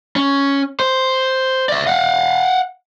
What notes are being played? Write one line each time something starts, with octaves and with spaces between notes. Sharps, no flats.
C#4
C5
D5 E5
F5 F#5